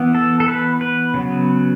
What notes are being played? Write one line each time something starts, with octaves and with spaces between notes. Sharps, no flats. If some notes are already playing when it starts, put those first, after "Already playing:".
Already playing: E3 B3
A4
A4
B4
B4
C#3 F#3 B3